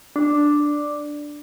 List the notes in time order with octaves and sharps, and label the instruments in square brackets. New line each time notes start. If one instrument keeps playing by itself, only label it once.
[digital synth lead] D4